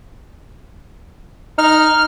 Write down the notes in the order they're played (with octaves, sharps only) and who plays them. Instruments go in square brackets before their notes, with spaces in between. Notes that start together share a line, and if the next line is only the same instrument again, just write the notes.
[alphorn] D#4 [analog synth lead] F6